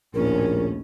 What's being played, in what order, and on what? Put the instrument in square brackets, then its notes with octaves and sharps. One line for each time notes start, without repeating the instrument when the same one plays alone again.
[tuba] A#1 [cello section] D#2 A2 C#4 [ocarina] A#4